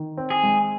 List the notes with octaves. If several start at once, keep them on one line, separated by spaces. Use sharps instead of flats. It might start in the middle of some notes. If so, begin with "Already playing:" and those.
Already playing: D#3
C4
G#4
G#3